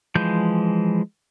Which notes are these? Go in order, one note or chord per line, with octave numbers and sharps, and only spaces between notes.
E3 F3 G#3 G6